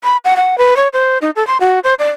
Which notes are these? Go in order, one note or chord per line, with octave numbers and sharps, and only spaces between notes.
B5
F#5
F#5
B4
C#5
C5
D#4
A4
C6
F#4
C5
D5